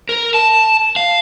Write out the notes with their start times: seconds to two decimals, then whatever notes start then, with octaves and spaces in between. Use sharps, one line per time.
0.09 A#4
0.34 A5
0.96 F5